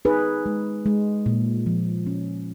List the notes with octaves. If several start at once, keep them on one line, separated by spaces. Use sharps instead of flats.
D#4 G#4 B4
G#3
G#3
A#2
F3
C#4